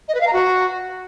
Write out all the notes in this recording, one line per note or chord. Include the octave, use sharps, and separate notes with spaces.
D#5
B4
F5
A#5
F#4